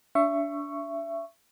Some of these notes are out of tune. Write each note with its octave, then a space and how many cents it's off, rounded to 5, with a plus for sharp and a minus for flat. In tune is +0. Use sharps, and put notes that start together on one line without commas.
D4 -25 E5 +25 C#6 +0